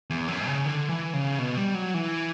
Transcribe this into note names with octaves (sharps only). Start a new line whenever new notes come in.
E2
F#2
C#3
D3
E3
C#3
B2
G3
F#3
E3